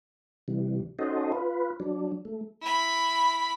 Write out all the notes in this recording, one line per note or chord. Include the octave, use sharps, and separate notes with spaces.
C3 E3 G3
C#4 D#4 F#4 A4 C5 D#5
F4 B4
F#3 D4
A3
E4 B5